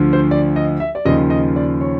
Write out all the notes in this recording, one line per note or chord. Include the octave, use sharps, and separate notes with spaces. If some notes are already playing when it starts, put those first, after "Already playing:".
Already playing: D2 D3 F3
C5
D5
D#5
E5
D5
D#2 C#3 F3 D#5
D#5
D5
C#5